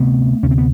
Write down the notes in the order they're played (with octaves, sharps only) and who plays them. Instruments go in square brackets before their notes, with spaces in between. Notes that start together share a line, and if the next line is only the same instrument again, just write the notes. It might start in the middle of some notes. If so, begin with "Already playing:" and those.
Already playing: [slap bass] D2 C3 A3 B3
D2 C3 C#4
C4
B3